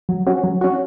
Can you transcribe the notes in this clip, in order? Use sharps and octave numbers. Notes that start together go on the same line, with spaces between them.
F#3
C#4 F#4
F#3
C#4 F#4